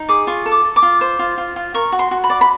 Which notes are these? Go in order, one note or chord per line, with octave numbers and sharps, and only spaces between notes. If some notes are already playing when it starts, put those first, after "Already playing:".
Already playing: D#4
G#4 D6
F4 C#6
A4
D6
A4
D6
F4
C5
F4
F4
F4
A#4 C#6
F#4
C6
F#4
B5
D5
B5